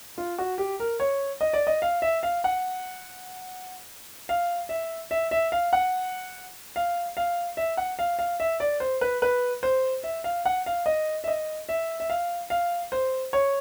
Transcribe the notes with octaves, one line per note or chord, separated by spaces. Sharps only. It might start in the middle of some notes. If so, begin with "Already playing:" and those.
F4
F#4
G4
A#4
C#5
D#5
D5
D#5
F5
E5
F5
F#5
F5
E5
E5
E5
F5
F#5
F5
F5
E5
F#5
F5
F5
E5
D5
C5
B4
B4
C5
E5
F5
F#5
F5
D#5
E5
D#5
E5
E5
F5
F5
C5
C#5